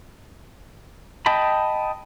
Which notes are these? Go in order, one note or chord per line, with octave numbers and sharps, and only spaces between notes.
D#5 G5 A5 B5